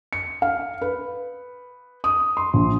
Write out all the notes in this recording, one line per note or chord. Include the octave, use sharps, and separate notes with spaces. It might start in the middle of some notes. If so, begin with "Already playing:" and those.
C#7
F5
B4
D#6
C6
A#1